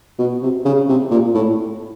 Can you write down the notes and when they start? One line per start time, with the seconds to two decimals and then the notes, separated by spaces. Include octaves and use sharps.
0.19 B2
0.42 C3
0.65 C#3
0.88 C3
1.11 A#2
1.34 A2